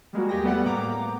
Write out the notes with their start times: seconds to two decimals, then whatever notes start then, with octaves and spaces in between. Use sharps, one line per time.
0.13 G3 G#3 A#3 F#4
0.29 E2 G4 G#4 G5 A#6
0.43 G3 A3 B3 A4 D5 F#5
0.65 A2 A#3 B3 G5 A#5 D6